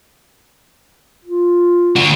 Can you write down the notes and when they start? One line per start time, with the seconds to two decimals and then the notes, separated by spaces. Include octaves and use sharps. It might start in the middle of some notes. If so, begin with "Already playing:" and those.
1.25 F4
1.96 D3 F#4